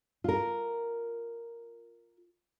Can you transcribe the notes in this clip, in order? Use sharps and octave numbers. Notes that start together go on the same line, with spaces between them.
F4 A#4